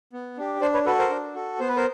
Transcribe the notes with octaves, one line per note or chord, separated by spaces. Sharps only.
B3
D4 G4
D4 C5 D5
B4 C#5
F#4 A4 B4
A#4 C5
D4
F#4 A4
B3 C5
B4
A#4 C5